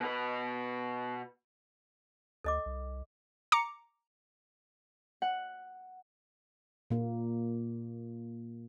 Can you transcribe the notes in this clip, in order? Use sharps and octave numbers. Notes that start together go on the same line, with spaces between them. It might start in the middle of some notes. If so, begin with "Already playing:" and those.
B2 B4
D2 A4 D#5 D6
C2
A#5 D6 C#7
F#5
A#2 A#3